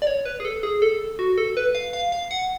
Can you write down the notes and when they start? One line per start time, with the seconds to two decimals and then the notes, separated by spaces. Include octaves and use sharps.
0.02 D5
0.07 C#5
0.25 B4
0.40 G#4
0.45 A4
0.63 G#4
0.82 A4
1.19 F#4
1.38 A4
1.57 B4
1.75 F5
1.93 F5
2.12 F5
2.31 F#5